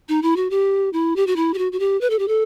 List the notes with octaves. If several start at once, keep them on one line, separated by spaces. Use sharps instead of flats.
D#4
E4
F#4
G4
E4
G4
F#4
E4
G4
F#4
F#4
G4
B4
A4
G4
A4